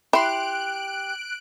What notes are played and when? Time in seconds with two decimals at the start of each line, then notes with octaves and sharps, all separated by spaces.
0.13 E4 G4 C6 F#6 D7